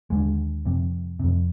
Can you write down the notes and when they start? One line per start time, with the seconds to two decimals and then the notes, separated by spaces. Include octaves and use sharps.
0.10 D#2 D3 G#3
0.65 F2 C3
1.19 F2 C3